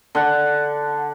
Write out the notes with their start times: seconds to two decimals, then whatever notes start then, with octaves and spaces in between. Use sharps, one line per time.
0.15 D3 F#5